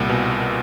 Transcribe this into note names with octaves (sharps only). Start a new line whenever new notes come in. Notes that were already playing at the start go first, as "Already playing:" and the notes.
Already playing: C2 A#2
B2